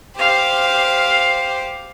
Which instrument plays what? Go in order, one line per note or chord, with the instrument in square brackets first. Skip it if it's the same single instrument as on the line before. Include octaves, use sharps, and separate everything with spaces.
[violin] G4 C5 [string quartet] F5